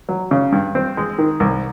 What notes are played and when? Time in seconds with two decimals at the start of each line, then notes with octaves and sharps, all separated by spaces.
0.09 F#3
0.31 C#3
0.52 G2
0.75 C4
0.97 G#3
1.18 D#3
1.40 C2